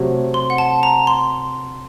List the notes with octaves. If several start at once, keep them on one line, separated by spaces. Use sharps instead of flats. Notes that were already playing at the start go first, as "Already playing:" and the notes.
Already playing: C3 F#3 A3
C6
F#5
A5
A#5
C6